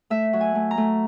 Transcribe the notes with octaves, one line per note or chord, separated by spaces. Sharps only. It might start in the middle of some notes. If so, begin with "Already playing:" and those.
A3 E5
F#3
G#5
A3
A#5
A3